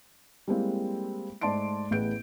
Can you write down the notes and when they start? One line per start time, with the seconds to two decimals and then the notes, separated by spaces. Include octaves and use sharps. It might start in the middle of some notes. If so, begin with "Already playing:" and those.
0.48 G3 G#3 A#3 C4 E4
1.41 G#2 A3 D5 A5 C6 D7
1.91 A1 A2 B3 G#4 G6 D7